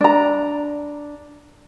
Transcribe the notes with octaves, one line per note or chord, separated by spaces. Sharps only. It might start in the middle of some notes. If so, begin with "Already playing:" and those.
D4 A#5